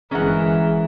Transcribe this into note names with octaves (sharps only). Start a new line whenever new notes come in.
G1 E3 G#3 C#4 G#4 A#4 F#5